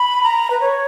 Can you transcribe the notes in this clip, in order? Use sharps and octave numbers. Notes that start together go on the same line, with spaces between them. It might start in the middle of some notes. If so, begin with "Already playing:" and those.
Already playing: B5
A#5
B4
C#5